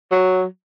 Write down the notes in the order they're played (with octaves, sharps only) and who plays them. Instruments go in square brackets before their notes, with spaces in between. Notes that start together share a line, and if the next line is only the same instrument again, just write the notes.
[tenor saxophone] F#3